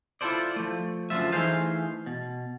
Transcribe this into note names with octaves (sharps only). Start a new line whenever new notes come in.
E4 F4 G#4 A4 C5 D5
F3 A3
F#2 D3 F3 F4 E5
E3 A3 D#4 G#4 C5 F5
B2